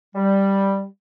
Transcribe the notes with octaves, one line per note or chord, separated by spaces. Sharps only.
G3